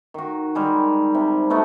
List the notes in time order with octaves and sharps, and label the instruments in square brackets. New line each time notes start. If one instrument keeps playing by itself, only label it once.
[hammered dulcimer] D#3 F#4
D#3 G3 G#3
C3
A3 B3 D#4 F#4